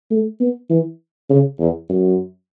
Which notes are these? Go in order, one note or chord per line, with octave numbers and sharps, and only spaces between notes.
A3
B3
E3
C#3
E2
F#2